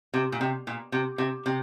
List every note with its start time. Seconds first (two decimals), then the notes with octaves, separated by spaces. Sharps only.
0.14 C3
0.32 A#2
0.41 C3
0.67 A#2
0.92 C3
1.18 C3
1.46 C3